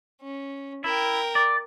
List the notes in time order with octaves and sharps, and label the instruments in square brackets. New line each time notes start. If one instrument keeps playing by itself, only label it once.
[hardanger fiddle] C#4
[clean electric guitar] E4 [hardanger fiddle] A#4 G5
[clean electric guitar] D5